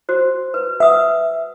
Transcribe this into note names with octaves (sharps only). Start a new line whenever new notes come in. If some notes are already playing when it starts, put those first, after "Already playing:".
F#4 C5
B4
B4 E5 F#5 D#6